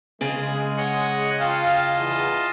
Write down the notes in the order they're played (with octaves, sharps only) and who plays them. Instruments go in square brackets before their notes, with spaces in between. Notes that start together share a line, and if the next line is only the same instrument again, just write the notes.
[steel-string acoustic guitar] C#3 G#4 [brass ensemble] G#3
[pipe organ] C#5 D#5 F#5
[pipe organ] F4 D#5 A5 [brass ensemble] F5 G5
[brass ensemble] E2